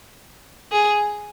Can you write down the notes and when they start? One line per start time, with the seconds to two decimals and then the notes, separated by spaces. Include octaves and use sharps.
0.72 G#4